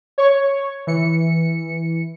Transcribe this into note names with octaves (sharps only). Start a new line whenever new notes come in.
C#5 C#6
E3 C#7